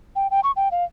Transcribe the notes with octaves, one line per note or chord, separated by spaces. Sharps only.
G5
G5
C#6
G5
F5